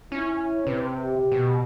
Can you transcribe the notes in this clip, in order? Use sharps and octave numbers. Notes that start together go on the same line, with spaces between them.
C#4 E4
C3 B4
G4
B2